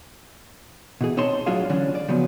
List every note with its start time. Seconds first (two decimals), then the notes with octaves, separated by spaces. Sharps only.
1.01 B2 E3 G#4
1.17 C4 D#4 C#5 A5 C6
1.46 A2 F#3 D4 F4 G#4 F5
1.70 D3 E3 C#4 D4
1.95 D5
2.08 C#3 F3 F#3 B3 B4